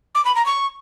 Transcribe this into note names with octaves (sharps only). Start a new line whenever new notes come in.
D6
B5
A#5
C#6